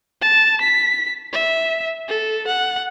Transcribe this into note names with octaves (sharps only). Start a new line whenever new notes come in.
A5
B6
E5
A4
F#5